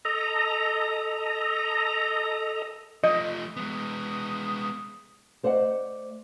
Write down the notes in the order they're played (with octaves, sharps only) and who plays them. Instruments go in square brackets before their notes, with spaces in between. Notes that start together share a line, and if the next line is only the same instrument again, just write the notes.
[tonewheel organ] A4 D#5 A#5
[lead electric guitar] F3 A3 [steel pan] D#5
[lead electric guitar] G#3 B3 [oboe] D#6
[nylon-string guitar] A3 C5 D5 D#5 F#5